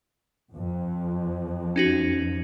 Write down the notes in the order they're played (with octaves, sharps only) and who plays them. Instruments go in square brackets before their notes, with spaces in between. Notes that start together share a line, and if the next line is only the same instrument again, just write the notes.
[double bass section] F2
[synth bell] C#4 D#4 F#4